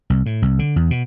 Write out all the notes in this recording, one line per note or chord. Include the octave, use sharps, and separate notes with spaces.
C2
A2
C2
D3
E2
B2